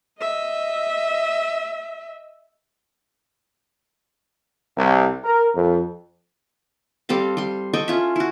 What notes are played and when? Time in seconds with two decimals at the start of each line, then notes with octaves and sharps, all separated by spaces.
0.20 D#5 E5
4.76 C2
5.24 A#4
5.55 F2
7.09 G3 C4 A4 F5
7.37 G3 C6
7.73 A4 D#5 G5 C#6
7.88 C#4 F4 E5
8.16 E4 F#4